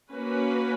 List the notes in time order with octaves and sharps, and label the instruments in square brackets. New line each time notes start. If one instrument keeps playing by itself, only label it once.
[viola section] A#3 C#4 F#4 B4